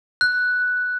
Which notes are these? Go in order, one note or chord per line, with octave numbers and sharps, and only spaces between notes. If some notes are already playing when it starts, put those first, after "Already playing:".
F#6